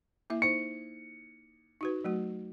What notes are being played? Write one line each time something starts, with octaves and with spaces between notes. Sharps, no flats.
A#3 E4 E5
D#4 C5 C#7
D#4 F#4 B4
F#3 A3 F#4